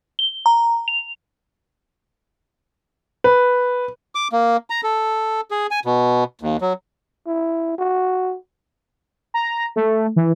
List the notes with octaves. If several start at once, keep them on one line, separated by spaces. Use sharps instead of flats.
G7
A#5
F7
B4
D6
A#3
A#5
A4
G#4
G#5
B2
D#2
F#3
E4
F#4
A#5
A3
E3